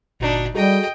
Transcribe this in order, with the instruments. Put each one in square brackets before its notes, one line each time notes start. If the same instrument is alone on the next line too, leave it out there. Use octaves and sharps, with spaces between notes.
[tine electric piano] G1 A#2 F#4 [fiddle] D4 D#4
[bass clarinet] G3 [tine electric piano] F#4 G#4 A4 [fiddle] D#5 G5